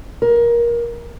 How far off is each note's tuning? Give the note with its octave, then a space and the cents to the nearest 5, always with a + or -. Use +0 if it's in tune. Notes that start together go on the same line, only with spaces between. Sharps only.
A#4 +20